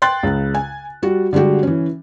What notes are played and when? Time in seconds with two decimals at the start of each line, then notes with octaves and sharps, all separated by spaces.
0.02 G5 C6 F#6 A6
0.23 C#2 C#3
0.55 G#5
1.02 G3 F#4
1.33 D3 G3 G#3 F#4 G4
1.63 E3 C#4